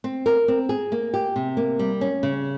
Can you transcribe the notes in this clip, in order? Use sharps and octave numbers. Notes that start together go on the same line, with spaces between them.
C4
A#4
C4
G#4
A#3
G4
C3
A#3
G3
C#4
C#3